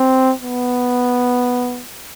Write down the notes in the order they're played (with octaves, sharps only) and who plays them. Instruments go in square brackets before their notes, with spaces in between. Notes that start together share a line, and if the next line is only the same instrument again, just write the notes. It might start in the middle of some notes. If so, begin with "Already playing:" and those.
Already playing: [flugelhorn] C4
B3